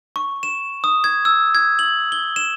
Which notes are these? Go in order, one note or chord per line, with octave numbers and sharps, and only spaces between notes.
C#6
E7
D#6
G#6
E6
G#6
F#7
G7
E7